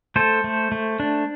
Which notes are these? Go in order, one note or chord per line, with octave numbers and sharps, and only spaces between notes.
A3 A4 C5
A3
A3
D4